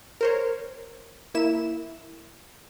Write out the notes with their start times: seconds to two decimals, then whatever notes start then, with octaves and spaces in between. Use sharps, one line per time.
0.21 A#4 C5 C#5
1.34 A#3 E4 E7